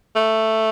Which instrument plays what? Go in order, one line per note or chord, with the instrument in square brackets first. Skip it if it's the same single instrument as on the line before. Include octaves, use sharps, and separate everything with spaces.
[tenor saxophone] A3